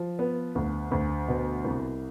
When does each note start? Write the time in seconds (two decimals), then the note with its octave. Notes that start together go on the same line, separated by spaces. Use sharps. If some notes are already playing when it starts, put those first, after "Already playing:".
Already playing: F3
0.19 B3
0.55 D2
0.91 D2
1.28 B2
1.64 C2